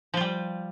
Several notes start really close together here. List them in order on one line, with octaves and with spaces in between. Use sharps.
F3 F4 G3